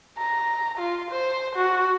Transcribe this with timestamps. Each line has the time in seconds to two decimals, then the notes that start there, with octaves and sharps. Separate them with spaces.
0.18 A#5
0.78 F4
1.11 C5
1.56 F#4